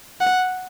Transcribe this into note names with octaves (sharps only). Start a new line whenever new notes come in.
F#5